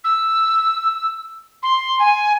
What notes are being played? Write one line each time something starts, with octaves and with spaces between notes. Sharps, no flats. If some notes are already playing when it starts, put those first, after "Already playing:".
E6
C6
G#5